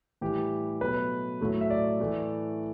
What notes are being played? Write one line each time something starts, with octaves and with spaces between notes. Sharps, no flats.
A2 E3 G3 G4
B2 F#3 A3 B4
A2 F#3 A3
E5
D5
A2 E3 A3